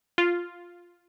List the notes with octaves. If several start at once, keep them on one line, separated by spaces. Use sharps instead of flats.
F4